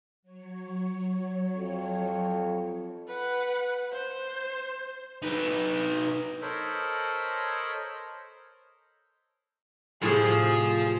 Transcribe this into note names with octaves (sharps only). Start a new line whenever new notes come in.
F#3 C#5
F2
B4 F#5
C5
D#4 B4
A4 A#4 C5 C#5 D#5 B5
A2 C3 F3 G#4